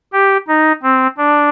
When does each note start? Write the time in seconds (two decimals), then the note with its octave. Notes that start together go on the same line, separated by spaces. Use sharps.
0.13 G4
0.48 D#4
0.83 C4
1.18 D4